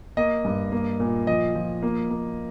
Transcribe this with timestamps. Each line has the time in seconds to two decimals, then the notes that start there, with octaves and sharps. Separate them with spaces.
0.17 A#3 D#5
0.45 G2
0.72 A#3
1.00 A#2
1.27 F3 D#5
1.55 F3
1.83 A#3
2.10 A#3